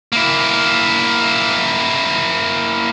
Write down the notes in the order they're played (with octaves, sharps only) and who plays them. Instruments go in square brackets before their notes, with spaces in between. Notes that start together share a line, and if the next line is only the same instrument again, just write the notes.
[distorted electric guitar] A#3 E4